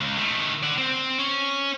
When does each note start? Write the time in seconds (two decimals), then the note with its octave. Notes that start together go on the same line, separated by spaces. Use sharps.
0.01 C#2
0.17 D#3 A3
0.63 D5 F#5
0.78 C4
1.18 C#4